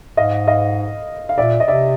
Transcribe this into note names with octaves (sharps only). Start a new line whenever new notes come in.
G#2 D#5 F5
D#5 F5
F5
A#2 D5 E5
D#5
C3 D5 E5